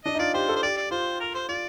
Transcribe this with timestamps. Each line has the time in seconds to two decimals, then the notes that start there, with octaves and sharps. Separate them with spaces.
0.05 D4 D#5
0.15 D#4
0.19 F4 D5
0.34 G4 C5
0.49 A4
0.56 C5
0.63 G4 D5
0.77 D5
0.91 F4 C5
1.20 A#4
1.35 C5
1.49 F4 D5